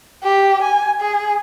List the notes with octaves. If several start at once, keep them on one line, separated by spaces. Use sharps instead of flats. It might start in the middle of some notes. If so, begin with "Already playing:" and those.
G4
G#5
G#4